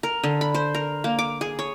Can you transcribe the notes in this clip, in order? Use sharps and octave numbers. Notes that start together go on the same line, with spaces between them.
A#4
D3
B5
C5
A#4
A#3
D6
G#4
C#5